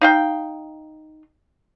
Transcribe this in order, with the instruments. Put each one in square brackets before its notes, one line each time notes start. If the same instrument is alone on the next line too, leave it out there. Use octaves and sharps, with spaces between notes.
[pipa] D#4 F5 G5